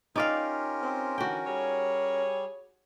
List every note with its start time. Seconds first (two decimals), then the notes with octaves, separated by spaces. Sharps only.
0.16 C#4 D#4 F4 G4 A#4 D5 F5
0.81 C4
1.18 D3 E3 F#4 G5
1.46 G3 G#4 C#5